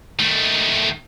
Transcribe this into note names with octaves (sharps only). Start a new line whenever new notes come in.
D#3 A3